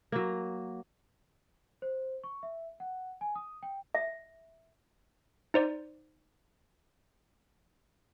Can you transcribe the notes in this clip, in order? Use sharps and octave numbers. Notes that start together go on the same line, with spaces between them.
F#3 A#3
C5
C#6
E5
F#5
G#5
D#6
G5
E5
D#4 C5 D5